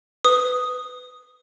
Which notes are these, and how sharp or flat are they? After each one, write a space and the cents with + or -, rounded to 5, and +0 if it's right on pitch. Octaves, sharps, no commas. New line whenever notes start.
B4 +20 D#6 +0